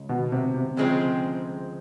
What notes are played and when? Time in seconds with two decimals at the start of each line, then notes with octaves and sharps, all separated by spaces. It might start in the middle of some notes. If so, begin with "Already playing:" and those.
Already playing: C#2
0.09 B2
0.32 C3
0.54 C3
0.77 D2 C#3 F3 G#3 C4